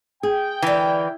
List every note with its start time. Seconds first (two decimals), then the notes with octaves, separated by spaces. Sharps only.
0.23 G#4 G5
0.62 D3 E3 A#4